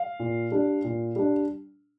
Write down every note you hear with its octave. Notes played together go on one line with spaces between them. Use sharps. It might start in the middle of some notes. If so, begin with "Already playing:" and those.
Already playing: F5
A#2
G3 D4
A#2
G3 D4